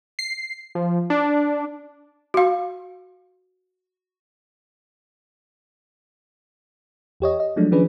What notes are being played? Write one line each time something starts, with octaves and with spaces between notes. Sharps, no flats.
C7
F3
D4
F#4 F5
E2 G4 C#5 D#5
D#5
F3 F#3 G#3 A3 D4
D#3 F3 C#4 D4 G#4 B4